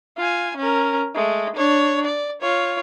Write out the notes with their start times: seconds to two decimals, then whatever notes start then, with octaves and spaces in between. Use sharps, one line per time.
0.17 F4 G#5
0.57 C#4 A#4
1.15 G#3 A3
1.56 D4 C#5
2.05 D5
2.42 F4 C#5